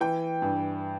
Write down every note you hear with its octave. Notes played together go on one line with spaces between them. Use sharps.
E3 G5
G2